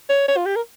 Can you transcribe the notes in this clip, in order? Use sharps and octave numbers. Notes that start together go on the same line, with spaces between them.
C#5
C#5
F4
G4
A#4